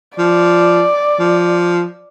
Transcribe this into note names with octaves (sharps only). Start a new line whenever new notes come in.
F3 D5
F3